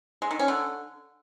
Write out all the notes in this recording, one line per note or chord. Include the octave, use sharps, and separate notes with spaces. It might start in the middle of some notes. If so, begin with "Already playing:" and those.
G#3
D#3
C#4
D3